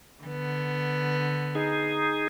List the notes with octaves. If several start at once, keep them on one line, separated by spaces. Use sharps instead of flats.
D3 B3
D#4 G#4